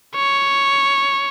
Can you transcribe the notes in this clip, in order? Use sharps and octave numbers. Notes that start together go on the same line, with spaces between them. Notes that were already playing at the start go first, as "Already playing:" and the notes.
C#5